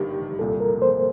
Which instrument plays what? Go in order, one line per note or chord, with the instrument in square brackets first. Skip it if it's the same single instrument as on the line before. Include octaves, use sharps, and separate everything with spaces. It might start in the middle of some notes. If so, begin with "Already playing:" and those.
Already playing: [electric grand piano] G1 G2 D#3 [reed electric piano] G4
[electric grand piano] C2 A#2 G3 [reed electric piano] A4
[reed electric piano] A#4
C5